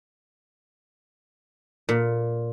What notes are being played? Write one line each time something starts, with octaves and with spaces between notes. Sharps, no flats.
A#2